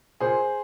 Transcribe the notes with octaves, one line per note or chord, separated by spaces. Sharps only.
A#2 G#4 C5